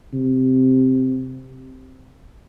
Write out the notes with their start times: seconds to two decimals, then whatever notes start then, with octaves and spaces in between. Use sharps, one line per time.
0.13 C3